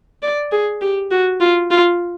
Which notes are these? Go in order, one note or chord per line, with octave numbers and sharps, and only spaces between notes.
D5
G#4
G4
F#4
F4
F4